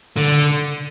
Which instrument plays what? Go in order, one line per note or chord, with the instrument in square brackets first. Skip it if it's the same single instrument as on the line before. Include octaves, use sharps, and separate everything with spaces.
[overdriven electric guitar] D3